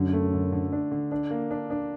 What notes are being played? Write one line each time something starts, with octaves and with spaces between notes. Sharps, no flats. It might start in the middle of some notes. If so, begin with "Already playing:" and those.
Already playing: F#2 D3
A3
D3
D3
D4
D3
D4
A#3
D4
D4